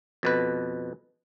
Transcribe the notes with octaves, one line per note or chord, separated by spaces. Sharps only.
F2 B2 B4